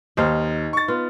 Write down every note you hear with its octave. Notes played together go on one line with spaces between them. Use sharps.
D#2 D#4 C5 F5
C#6 A6
B3 F4